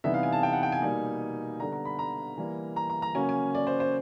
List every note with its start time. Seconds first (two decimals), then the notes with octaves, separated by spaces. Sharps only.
0.04 C3 E3 G3 B3 D#4 E5
0.14 F5
0.23 G#5
0.33 A5
0.43 G5
0.53 F#5
0.63 G5
0.72 G#5
0.82 B2 G3 A#3 D#4
1.60 D3 G3 B3 A#5
1.72 A#5
1.85 B5
1.99 A#5
2.38 E3 G3 A#3
2.76 A#5
2.90 A#5
3.02 A#5
3.15 C#3 F#3 A#3 C#4 G#5
3.29 G#5
3.55 D5
3.67 C5
3.80 C5